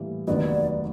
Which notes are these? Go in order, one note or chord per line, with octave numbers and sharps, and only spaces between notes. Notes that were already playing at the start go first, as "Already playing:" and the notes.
Already playing: A2 E3 G3 A#3
F1 D#2 D#3 F#3 B3 D5 D#5